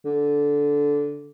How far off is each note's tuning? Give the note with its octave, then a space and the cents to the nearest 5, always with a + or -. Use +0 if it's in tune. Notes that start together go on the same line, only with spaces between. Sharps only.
D3 -10